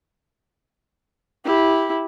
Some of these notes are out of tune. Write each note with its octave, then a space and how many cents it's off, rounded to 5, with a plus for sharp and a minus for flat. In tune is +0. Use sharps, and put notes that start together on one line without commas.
E4 -10 G4 +0